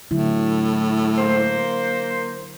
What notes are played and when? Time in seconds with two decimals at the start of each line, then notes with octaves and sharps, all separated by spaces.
0.11 A2 D3 F#3 E4
1.18 A#3 C5